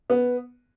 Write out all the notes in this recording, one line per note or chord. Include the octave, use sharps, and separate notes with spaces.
B3